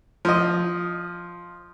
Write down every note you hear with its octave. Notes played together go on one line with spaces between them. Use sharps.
F3 D#5